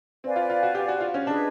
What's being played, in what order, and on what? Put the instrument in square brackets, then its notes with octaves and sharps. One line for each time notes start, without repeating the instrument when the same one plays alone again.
[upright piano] C4 [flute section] B4 D5 F5 G#5
[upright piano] F4
F4
F#4
G4
F#4
F4
C#4
[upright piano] D4 [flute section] G#4 B4 D#5